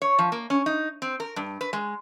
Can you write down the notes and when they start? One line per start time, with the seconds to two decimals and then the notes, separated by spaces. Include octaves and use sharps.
0.02 C#5
0.19 F3
0.32 A#3
0.50 C#4
0.66 D#4
1.02 C4
1.20 A#4
1.36 G2
1.61 B4
1.73 G#3